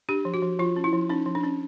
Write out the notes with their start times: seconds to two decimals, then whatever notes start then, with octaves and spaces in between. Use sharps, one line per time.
0.09 D4 G4
0.25 F3
0.34 F#4
0.42 F3
0.59 F3 F4
0.76 C#4
0.84 E4
0.93 F3
1.09 C#4 D#4
1.26 F3
1.35 D4
1.43 C#4